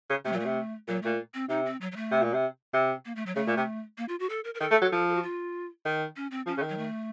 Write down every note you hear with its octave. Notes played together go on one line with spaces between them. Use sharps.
C#3
C3 A3
A#2 F#3
A3
C3
A#2 F#3
A#2 A3
C4
C3 D#4
C4
F#3
F#3
A3
C3
A#2
C3
C3
A#3
A3
F#3
C#3 A3
A#2
C3
A#3
F4
F#4
A4
A#4
A#4
D#3 A4
A3
F#3
F3
A4
F#4
F4
D#3
C#4
C4
F3 C#4
C#3
D#3
F#3
A3